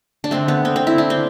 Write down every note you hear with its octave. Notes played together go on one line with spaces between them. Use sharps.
D4
D3 A3 C4
B3
C4
C4
E4
D4
C4